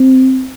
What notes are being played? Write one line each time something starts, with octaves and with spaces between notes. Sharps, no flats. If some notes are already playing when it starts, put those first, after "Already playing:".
Already playing: C4